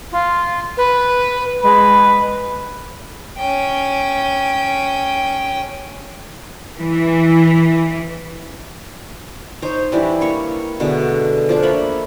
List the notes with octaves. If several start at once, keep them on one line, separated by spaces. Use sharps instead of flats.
F4
B4
G#3 B4
C#4 G5
E3
D#4 C5 C#5
E3 G3 D4 E4
A#3 C#5 C#6
B2 D3 G#3 A3
F3 D4 F4
A#3 C#5 E5 B5